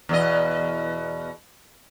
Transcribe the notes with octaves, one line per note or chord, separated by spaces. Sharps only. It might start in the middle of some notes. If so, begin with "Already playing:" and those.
E2 B2 D#5